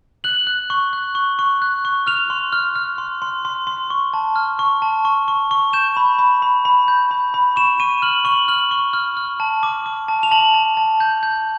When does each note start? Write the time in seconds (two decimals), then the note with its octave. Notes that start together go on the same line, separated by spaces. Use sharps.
0.24 F#6 F#7
0.47 F#6
0.70 C#6
0.93 F#6
1.15 C#6
1.39 C#6
1.62 F#6
1.85 C#6
2.07 F6 F7
2.30 C6
2.53 F6
2.76 F6
2.98 C6
3.22 C6
3.45 C6
3.67 C6
3.90 C#6
4.13 A5
4.36 F6
4.59 C#6
4.82 A5
5.05 C#6
5.28 C#6
5.51 C#6
5.73 G6 E7
5.97 B5
6.19 B5
6.42 B5
6.65 B5
6.88 G6
7.11 B5
7.34 B5
7.56 C#6 E7
7.80 C#6 D#7
8.02 F6 F#7
8.25 C#6 F#7
8.48 F6 F#7
8.71 C#6
8.93 F6
9.17 F6
9.40 A5
9.63 D6
9.86 D6
10.08 A5
10.23 F7
10.32 A5 F#7
10.54 A5
10.77 A5
11.00 G6
11.23 G6